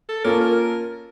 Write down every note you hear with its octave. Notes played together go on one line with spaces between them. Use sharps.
A4
A#3 C#4 F4 A4 A#4
A#4